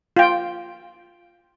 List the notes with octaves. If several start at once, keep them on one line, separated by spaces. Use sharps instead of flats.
F4 G5